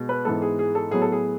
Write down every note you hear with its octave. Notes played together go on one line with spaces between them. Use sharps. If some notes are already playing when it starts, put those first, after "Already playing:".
Already playing: B2 G#3
B4
G#2 E3 B3 A4
G#4
G#4
A4
A2 F#3 B3 G#4
A4
G#4